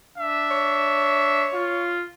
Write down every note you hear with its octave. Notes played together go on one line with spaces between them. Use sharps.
D4 E5
C#5
F4